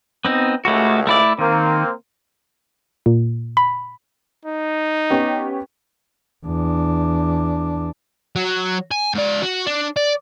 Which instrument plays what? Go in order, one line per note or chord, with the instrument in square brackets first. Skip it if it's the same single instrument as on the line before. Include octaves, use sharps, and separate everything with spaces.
[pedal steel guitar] B3 C4 D#4
[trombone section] C#2 [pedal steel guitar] A3 F#4
[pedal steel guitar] A3 E4 D5
[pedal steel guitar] D#3 [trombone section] A#3 C4
[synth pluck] A#2
B5
[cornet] D#4
[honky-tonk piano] B3 C#4 G4
[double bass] E2 D4
[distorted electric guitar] F#3
G#5
G#2 D5
F#4
D4
D5